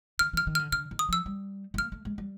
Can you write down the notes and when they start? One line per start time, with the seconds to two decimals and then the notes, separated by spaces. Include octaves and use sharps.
0.19 D#3 F6
0.33 E3 F6
0.47 D#3
0.55 D3 F6
0.72 D3 F6
0.91 D#3
0.99 D#6
1.09 F3 E6
1.26 G3
1.74 A3
1.78 A#3 F6
1.92 A3
2.05 G#3
2.18 G3